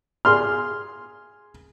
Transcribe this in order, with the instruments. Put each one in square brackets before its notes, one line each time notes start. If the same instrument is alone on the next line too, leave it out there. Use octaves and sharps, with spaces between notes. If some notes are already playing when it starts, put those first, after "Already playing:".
[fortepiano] G#4 C6 F6